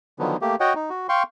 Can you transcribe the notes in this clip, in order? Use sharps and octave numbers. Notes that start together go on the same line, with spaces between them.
D3 D#3 F3 F#3 B3
A3 A#3 G4
F#4 C#5 D#5 F#5 G5
D#4
F#4
F5 G5 C6 C#6